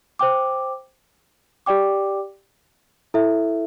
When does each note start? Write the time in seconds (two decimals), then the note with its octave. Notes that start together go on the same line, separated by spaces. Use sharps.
0.19 C5 G5 D6
1.66 G4 D5 G5 D6
3.14 E4 A4 E5